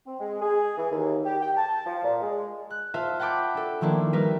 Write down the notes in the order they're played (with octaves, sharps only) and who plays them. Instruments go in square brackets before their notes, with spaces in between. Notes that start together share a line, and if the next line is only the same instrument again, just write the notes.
[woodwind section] C4
G#3
G#4
E3
D#2
G4
G5
A5
F3
A#2
G#3
[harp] F#6
F4 C5 E5 F5 A5
F#5 G5 A5 B5 D6 G6
D4 A4
D#3 F3 A3 A#3 D4 E4
G3 A#4 B4 E5